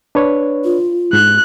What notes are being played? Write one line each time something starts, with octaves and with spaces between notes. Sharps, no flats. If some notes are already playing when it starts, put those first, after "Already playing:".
D4 B4 C#5
F4
G#2 F#6